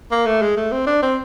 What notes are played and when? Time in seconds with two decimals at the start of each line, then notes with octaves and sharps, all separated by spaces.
0.11 A#3
0.26 A3
0.42 G#3
0.57 A3
0.72 C4
0.87 D4
1.02 C4